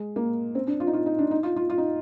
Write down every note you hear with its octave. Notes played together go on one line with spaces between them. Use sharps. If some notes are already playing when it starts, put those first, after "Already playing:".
Already playing: G#3
A#3
C4
D4
F4
D#4
F4
D#4
D4
D#4
F4
F4
F4
D#4